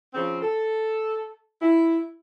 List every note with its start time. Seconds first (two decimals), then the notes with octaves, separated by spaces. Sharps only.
0.14 C#3 F3 C4
0.42 A4
1.61 E4